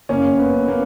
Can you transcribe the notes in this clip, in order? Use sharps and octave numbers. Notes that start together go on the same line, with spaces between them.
F#1 A#3 C#4
F#1
B3
F#2
A#3